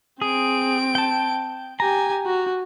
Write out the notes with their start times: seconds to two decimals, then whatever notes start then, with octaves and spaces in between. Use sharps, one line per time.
0.22 C4 G#4 D7
0.95 G5 A5
1.80 G4 G#5 A#5
2.26 F#4